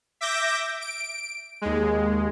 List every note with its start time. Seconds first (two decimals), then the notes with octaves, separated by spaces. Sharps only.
0.21 E5 D6 G6 A#6
0.81 D7
1.62 D#2 G#3